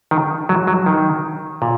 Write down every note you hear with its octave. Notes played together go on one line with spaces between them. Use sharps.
D#3
F#3
F#3
D#3
A#2